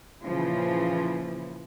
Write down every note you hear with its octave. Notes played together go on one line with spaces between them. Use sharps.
A#2 C#3 E3 F3